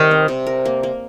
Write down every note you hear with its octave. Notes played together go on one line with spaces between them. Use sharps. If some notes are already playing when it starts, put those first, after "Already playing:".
Already playing: C3 D#3 G3 G4
C4
C3
A#4
A#3
A#3